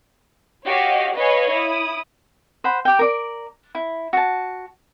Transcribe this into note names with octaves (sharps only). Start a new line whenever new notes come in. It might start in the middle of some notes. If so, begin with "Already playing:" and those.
F#4 G4 C#5 D#5 F5
B4 C#5 D#5 F5 G#5
E4 D#6
C5 F#5 B5
G4 G5
A#4 D5
E4
F#4 A5